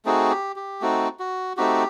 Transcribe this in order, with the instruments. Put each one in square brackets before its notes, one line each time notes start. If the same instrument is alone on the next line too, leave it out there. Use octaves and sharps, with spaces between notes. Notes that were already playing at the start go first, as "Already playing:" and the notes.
[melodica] A3 C4 D#4 F#4 G#4
G4
G4
A3 C4 D#4 F#4
F#4
A3 C4 D#4 F#4 G4